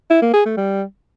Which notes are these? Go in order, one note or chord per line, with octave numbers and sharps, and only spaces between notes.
E4
A#3
G#4
A3
G3